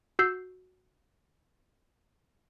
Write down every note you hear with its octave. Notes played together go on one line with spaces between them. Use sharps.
F#4 E6 G6 C7